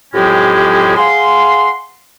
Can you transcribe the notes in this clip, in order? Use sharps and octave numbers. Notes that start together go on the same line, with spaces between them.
F2 A2 F#3 G#3 C#4 G4
G#4 F5 F#5 C6